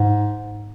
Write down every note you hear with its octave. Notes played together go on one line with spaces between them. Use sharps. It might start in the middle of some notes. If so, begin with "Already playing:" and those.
Already playing: G#2